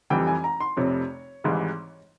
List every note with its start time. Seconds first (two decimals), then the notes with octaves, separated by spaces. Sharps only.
0.10 F1 F2 E3 G3 G5
0.27 G#5
0.44 A#5
0.60 C6
0.77 F1 F2 C3 C#5
1.44 G#1 G#2 E3 G3